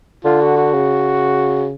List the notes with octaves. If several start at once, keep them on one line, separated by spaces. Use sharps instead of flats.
D3 F4
F#4
F#4
C#3